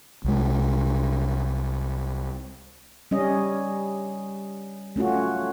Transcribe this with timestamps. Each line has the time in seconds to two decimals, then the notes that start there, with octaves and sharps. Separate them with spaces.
0.24 C2 G#3
3.11 G3 C#4 D#5
4.96 A3 C#4 F4 F#4